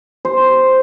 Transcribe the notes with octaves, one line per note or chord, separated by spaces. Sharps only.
C5